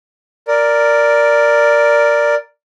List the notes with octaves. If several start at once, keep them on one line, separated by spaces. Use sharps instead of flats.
A#4 D5